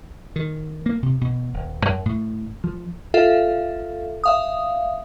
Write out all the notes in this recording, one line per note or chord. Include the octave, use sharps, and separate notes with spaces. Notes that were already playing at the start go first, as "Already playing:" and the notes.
D#3
A#3
C3
B2
D#1
F#2
A2
F3
F4 A4 E5 F5
E5 F5 D#6